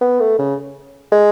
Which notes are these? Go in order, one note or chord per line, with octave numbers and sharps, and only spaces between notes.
B3
A3
C#3
G#3